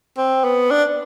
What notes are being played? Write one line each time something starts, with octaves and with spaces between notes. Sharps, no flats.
C4
B3
D4